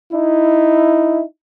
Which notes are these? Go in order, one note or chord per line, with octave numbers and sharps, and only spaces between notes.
D#4 E4